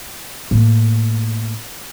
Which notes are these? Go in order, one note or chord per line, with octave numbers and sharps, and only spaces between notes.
A2 A#3